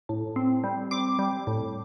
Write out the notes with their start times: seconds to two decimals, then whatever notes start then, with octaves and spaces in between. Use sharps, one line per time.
0.09 A2
0.36 C4
0.64 G3
0.91 C4 D6
1.19 G3
1.47 A2